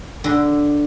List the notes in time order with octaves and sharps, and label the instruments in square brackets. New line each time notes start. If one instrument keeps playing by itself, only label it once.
[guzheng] D3